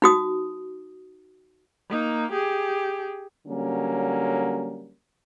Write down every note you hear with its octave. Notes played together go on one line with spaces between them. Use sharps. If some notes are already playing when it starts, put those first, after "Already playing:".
D#4 F#4 D#6
A#3 D#4
G4 G#4
D3 F#3 G3 A#3 C#4